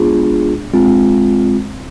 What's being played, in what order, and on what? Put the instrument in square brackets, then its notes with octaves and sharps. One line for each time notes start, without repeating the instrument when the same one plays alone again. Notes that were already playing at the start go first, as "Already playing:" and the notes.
Already playing: [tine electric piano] G#3 B3 D4 F4 G#4
G#3 C4 F4